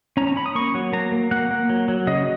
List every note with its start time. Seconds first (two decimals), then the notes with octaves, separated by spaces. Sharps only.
0.17 C#4 A#5
0.27 A#5
0.36 C#4 B5
0.46 D#6
0.55 A#3 C#6
0.74 F#3
0.93 A#3 A#5
1.12 A#3
1.31 A#3 F#5
1.51 A#3
1.69 F#3
1.88 F#3
2.07 C#3 D#5